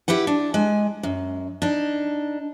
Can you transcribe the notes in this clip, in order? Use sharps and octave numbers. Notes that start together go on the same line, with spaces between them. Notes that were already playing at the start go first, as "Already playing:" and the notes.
E4 G4 B4 F#5
D4
G#3 G#5
F#2
D4 D#4